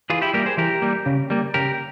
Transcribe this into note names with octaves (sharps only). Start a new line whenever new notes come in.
E3 F4 G#4
E4 G4
G3 A#3 G4 A#4
G#4 C5
E3 G4 A#4
G3 A#3
C#3
G3 A#3
C#3 G4 A#4